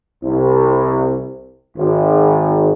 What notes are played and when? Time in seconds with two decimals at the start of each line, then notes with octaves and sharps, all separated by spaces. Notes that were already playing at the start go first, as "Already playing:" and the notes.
0.23 C2
1.77 G#1